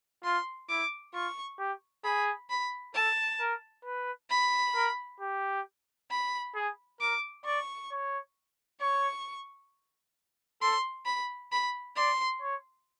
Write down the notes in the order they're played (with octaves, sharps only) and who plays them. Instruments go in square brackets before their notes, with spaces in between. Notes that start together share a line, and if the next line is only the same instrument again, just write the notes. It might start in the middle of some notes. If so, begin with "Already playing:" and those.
[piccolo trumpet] F4 [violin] C6
[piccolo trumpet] E4 [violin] D6
[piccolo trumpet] F4 [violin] C#6
[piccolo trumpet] G4
[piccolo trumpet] G#4 [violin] B5
[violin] B5
[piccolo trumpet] A4 [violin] A5
[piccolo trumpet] A#4
B4
[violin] B5
[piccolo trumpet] A#4
G4
[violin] B5
[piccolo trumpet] G#4
[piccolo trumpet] A#4 [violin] D6
[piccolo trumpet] D5 [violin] C#6
[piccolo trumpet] C#5
[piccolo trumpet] C#5 [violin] C#6
[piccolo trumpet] A4 [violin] C6
[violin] B5
B5
[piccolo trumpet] D5 [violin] C6
[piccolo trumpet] C#5